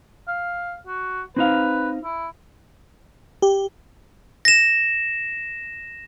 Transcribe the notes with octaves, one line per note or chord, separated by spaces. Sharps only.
F5
F#4
C4 D#4 B4 F5
E4
G4
A#6 E7